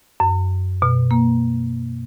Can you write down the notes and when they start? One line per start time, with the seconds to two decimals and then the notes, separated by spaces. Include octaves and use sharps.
0.20 F#2
0.82 B2
1.11 A#3